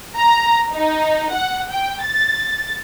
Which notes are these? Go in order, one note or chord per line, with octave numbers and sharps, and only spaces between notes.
A#5
D#4
F#5
G5
A6